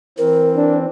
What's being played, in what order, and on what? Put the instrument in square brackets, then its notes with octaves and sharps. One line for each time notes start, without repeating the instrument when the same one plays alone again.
[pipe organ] E3 C4 [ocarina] A#4
[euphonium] D4